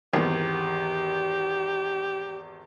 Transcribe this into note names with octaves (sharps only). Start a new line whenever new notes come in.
G#1 E2 G4